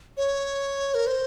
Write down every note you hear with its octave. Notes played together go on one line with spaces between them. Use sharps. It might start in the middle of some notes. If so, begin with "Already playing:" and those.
C#5
A#4
C5